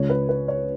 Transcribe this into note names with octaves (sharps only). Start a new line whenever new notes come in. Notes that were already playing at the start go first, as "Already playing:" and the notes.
Already playing: C#2 C#3 G#3 C#5
B4
B4
C#5